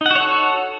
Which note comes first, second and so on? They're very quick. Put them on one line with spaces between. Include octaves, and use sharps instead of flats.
D#4 F#5 F#4 C#5 A4